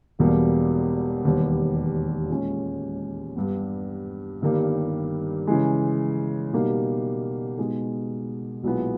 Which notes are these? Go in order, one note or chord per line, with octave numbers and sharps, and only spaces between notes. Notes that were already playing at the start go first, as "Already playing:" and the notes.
E1 E2 B2 G3 A#3
E1 D#2 D#3 G3 B3
A#2 G#3 C#4
G2 G3 B3
G1 G2 D#3 G3 A#3
C#3 E3 G#3
B2 G3 A#3 D#4 G4
B2 G#3 D#4 G#4
B1 A#2 G#3 B3 E4